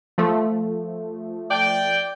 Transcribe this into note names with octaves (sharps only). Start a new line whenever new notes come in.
F3 A3
D5 G5